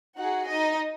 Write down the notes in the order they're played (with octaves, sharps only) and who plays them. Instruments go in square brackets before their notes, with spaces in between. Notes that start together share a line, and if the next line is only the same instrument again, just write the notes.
[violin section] D#4 F#4 G#4 F#5
D#4 D#5